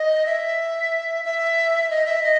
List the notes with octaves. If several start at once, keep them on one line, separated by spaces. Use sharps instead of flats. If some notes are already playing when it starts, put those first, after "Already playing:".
Already playing: D#5
E5
E5
D#5
E5
D#5